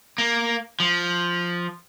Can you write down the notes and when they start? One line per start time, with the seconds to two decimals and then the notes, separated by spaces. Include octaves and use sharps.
0.18 A#3
0.80 F3